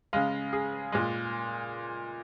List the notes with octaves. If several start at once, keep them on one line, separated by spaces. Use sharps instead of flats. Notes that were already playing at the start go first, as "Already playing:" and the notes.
C#3 G#3 F5
G#4
A#2 G#3